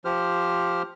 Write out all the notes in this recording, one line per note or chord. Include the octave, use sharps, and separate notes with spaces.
F3 G4 C5 F6